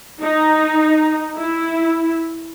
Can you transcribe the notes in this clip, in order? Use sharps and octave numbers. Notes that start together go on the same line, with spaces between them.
D#4
E4